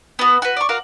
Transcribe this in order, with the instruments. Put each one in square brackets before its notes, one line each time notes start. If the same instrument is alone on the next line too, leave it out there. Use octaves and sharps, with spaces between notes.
[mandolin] B3 F#4
F#4 B4
D5 C#6
F#4 A#4 F5